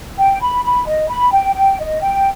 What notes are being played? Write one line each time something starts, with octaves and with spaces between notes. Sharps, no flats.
G5
B5
B5
D#5
B5
G5
G5
D#5
G5